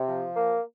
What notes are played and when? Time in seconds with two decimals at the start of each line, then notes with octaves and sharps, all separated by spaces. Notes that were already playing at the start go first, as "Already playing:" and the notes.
Already playing: C3
0.08 F3
0.36 A#3